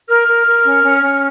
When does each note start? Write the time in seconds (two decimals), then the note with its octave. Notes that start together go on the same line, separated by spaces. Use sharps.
0.08 A#4 F6
0.27 A#4
0.46 A#4
0.64 C#4
0.82 C#4
1.01 C#4